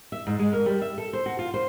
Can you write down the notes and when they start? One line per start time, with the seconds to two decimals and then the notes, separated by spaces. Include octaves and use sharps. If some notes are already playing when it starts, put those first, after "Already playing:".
0.12 E5
0.27 G#2
0.39 G#3
0.53 A#4
0.66 G3
0.82 E5
0.98 A4
1.13 C5
1.26 F#4
1.39 F4
1.54 C5